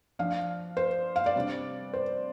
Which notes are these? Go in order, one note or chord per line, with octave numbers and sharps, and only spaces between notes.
F3 D4 F5
C5
F5
D5
C3 G3 D4
C5